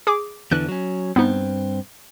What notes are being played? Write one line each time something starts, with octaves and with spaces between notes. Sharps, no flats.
G#4 D6
E2 D3 E3 F#6
F#3 C#4
G2 B3 C4 D#4